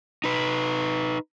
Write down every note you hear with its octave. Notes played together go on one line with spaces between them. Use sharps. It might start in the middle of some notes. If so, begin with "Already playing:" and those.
D#4 B4